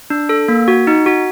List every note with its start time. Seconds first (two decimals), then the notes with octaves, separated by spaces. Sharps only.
0.10 D4
0.29 A4
0.48 A#3
0.68 F#4
0.87 D#4
1.06 F#4